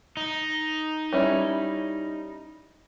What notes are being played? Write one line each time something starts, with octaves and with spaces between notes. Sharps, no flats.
D#4
G3 C#4 E4